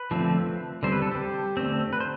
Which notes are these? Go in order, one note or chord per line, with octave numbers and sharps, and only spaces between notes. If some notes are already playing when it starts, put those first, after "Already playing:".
Already playing: B4
D3 F3 A3 C4
D3 G3 C4 C5
B4
A4
G4
D3 A3 C4
B4
C5